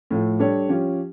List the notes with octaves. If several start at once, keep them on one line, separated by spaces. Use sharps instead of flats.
A2 F3 A3
G3 D4 A4 C#5
F3 C#4 G4